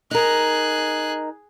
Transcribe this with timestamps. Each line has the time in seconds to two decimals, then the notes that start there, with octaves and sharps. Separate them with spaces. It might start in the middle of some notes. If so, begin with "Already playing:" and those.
0.11 D#4 G#4 A#4 F#6